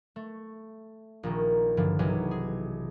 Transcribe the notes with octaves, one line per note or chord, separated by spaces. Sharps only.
A3
A#1 A#2 D#3
G2 D3 E3 F3
B1 C3 E3 F#3 G#5
G#4